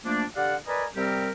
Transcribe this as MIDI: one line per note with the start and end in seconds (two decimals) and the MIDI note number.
0.05 0.24 53
0.05 0.24 57
0.05 0.24 58
0.05 0.24 62
0.36 0.55 50
0.36 0.55 67
0.36 0.55 74
0.36 0.55 77
0.36 0.55 78
0.67 0.85 70
0.67 0.85 71
0.67 0.85 74
0.67 0.85 75
0.67 0.85 80
0.67 0.85 83
0.96 1.31 48
0.96 1.31 55
0.96 1.31 60
0.96 1.31 67
0.96 1.31 70